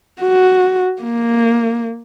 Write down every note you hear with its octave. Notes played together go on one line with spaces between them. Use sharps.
F#4
A#3